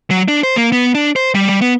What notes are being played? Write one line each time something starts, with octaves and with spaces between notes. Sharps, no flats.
F#3
D4
C5
A#3
B3
D4
C5
G3
G3
B3